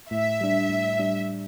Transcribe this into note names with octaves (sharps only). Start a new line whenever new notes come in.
A2 E5
G3 D4
A2
G3 D4